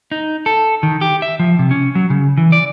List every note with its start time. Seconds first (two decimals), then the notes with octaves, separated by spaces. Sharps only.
0.12 D#4
0.46 A4
0.83 D#3
1.01 G4
1.22 E5
1.39 F3
1.59 C3
1.71 C#4
1.95 F#3
2.10 C#3
2.37 E3
2.52 D5